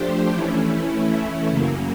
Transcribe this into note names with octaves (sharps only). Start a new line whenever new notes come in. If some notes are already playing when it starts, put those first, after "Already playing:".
Already playing: F3 A3 D4 G4 C5
E3 A3 C#4 E4
F#2 C#3 F#3 A#3